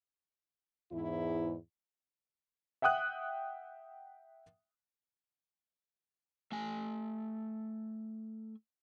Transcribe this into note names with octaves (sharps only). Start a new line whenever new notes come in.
E2 G#2 E4
E5 F#5 G5 D#6 F#6
A3 G#5